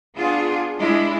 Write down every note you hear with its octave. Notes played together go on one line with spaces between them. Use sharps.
B3 D4 F4 G#4
G#3 D4 E4